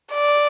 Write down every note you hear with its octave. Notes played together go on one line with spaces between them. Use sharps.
D5